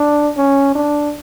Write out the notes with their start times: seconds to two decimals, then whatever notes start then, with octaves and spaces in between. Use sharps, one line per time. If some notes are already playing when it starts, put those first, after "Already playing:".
Already playing: D4
0.37 C#4
0.75 D4